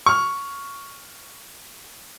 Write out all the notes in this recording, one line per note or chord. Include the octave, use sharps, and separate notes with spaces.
C#6 F6